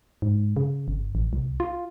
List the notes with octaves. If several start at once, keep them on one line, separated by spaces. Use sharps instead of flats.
G#2
C#3
G1
A1
C2
F4